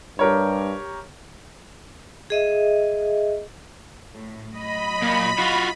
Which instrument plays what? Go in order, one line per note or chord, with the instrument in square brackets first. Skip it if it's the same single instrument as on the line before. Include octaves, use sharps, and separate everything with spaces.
[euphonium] G2 [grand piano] G4 A#4 C#5
[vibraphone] G#4 D#5 E5
[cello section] A2
[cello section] F#3 D#5 [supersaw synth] B5
[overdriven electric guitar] A#2
F4 F#4